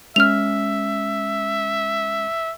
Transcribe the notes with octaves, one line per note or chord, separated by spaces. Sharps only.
G#3 C#4 E5 F6 F7